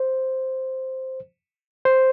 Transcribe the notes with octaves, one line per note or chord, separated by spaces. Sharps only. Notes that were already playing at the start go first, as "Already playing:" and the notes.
Already playing: C5
C5